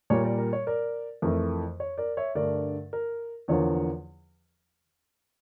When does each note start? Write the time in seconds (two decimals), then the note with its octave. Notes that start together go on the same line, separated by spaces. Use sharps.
0.10 A#2 G3 A#3 C#5
0.24 A#4 D5
0.38 A#4
0.53 C#5
0.67 A#4 D5
1.22 F2 E3 A3 A#4
1.80 C#5
1.98 A#4 D5
2.17 C#5 E5
2.35 G2 D3 A3 A#4 D5
2.93 A#4
3.48 E2 D3 F3 A#3 C#5